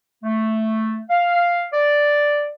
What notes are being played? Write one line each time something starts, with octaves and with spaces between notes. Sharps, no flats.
A3
F5
D5